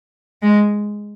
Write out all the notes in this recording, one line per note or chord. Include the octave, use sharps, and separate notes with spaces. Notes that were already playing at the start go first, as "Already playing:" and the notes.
G#3